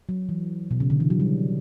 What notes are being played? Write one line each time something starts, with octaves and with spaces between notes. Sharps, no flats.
F#3
E3
B2
C#3
D3
E3
F#3
G3